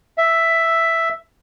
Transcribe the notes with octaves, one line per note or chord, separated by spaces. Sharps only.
E5